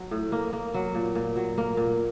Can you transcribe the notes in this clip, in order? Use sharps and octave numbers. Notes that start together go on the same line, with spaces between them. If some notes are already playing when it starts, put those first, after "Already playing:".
Already playing: F#3
A2
A#3
A#3
F#3
A#2
A#2
F#3
A#3
A#2